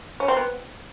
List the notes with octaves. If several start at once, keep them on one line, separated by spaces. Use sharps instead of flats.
C#4
C4
B3